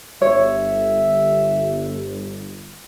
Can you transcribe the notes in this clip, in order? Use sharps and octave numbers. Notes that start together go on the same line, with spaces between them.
G1 C#5 E5